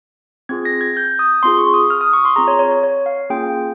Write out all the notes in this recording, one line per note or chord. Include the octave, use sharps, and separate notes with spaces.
C4 F4 G#4 G#6
A#6
G#6
G6
D#6
C4 F4 G#4 C6
C#6
D#6
F6
D#6
C#6
C6
C4 F4 G#4 A#5
C#5
C#5
C#5
C#5
F5
A#3 C#4 F4 G#4 G5